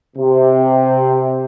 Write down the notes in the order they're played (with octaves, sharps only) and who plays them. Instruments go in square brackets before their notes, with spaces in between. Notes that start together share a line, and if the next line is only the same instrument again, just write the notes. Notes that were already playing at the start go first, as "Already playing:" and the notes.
[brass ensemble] C3